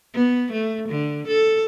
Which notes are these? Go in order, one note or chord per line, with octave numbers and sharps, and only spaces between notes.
B3
A3
D3
A4